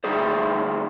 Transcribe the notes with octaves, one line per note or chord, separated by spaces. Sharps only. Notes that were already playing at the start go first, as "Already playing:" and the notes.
D2 G3 D#4 E4 G#4 C5